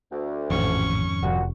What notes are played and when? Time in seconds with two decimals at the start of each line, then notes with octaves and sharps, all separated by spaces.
0.11 D2
0.50 A1 F2 G#2 D#3 C#4 C#6
1.23 F1 A#2 F#4